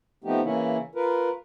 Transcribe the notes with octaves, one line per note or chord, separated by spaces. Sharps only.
F3 A3 B3 C4 D#4 G4
C#3 E3 A#3 C#4 E4
F4 A#4 B4